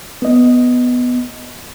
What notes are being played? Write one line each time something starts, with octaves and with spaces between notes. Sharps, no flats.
B3 D#5